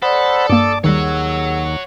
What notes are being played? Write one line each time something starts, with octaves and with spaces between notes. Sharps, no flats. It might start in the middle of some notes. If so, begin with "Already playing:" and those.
A4 C5 D5 F#5 B5 D#6
G2 A#3 A5 D6
D#2 D#3 G3 G#4 C#5 F#5 E6